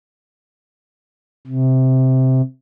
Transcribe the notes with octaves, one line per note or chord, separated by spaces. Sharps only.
C3